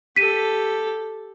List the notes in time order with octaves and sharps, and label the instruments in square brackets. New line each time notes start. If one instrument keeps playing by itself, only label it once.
[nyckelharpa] G4 A4 [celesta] B6 D#7